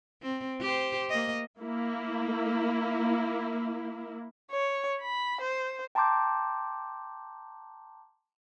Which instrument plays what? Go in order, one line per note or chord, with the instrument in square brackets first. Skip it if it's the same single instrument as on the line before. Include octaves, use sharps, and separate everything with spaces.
[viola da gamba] C4
G4 C5
A#3 D#5
[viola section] A#3 E4
[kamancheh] C#5
B5
C5
[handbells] G5 A5 A#5 C6 D6 G6